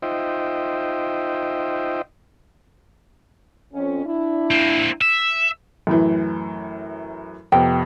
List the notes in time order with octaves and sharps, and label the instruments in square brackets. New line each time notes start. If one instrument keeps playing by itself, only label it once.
[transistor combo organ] D#4 F4 C5 D#5 E5 G5
[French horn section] F2 C#4
D4 E4
[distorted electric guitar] A#3 C4
E5
[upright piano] F#2 A2 E3
[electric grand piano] F2 C3 B3 [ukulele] G5